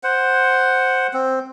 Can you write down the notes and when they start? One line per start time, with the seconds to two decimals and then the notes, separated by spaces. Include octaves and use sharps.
0.03 C5 F#5
1.13 C4